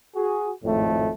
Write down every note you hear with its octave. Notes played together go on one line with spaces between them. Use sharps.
F#4 G#4
G#1 F2 A2 A3